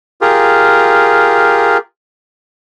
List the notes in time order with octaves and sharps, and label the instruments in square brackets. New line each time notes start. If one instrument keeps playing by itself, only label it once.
[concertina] F4 G4 G#4 A#4